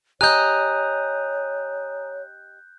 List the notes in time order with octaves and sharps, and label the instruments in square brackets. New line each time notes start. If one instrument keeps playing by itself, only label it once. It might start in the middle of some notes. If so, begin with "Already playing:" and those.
[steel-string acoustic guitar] G4 D#5 [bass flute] C#5 [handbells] G#5 A#5 D#6 [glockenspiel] F#6 G6